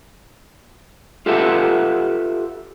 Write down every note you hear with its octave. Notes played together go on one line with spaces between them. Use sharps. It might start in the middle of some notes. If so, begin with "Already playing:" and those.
F4 G4 A4 B4 E5 F#5